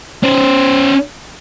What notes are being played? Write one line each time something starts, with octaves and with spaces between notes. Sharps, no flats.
C#4 C5